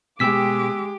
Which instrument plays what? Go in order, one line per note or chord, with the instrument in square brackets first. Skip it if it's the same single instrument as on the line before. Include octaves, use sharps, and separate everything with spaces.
[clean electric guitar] B2 B3 G5 [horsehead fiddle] G#3 [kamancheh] G4 D6 [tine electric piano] E6 B6